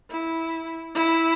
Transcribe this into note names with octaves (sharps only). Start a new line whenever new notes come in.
E4
E4